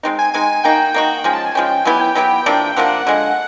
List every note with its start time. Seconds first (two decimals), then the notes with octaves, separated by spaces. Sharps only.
0.03 G#3 C4 D#4
0.19 G#5
0.34 G#3 C4 D#4 G#5
0.64 A#3 D#4 F#4 G5
0.94 A#3 D#4 F#4
1.24 F3 G#3 C#4
1.33 A5
1.45 G#5
1.55 F3 G#3 C#4 G5
1.85 F#3 B3 E4 G4 G#5
2.01 G5
2.15 F#3 B3 E4 G4
2.46 C3 F3 A#3 D4
2.76 C3 F3 A#3 D4 F#5
3.07 D3 F3 G#3